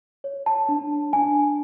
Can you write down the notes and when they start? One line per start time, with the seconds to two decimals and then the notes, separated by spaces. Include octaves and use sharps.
0.24 C#5
0.46 A5
0.69 D4
1.13 D4 G#5